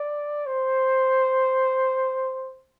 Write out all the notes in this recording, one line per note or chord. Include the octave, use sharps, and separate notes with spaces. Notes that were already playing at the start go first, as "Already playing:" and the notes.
Already playing: D5
C5